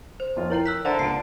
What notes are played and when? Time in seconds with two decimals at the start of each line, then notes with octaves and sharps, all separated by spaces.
0.20 C5
0.36 F2 F4 C#5
0.50 E4 A#4 C#5 G5 F#7
0.66 E6 F#6 B6
0.85 D3 C5 E5 A#5
0.99 C#2 F4 C7 D7